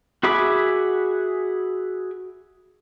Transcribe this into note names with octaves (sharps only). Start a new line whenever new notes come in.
F#4 G#4 E5 B5 D6